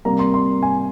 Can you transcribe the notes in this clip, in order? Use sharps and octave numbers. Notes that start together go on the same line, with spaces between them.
C3 G3 A#3 A#5
C6
C6
G#5